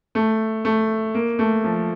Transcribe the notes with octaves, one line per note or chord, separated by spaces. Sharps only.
A3
A3
A#3
A3
F3